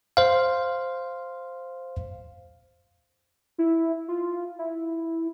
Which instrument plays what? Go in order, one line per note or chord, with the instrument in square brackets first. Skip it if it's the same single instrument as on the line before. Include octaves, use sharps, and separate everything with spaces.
[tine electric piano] C5 F5
[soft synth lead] E4
F4
E4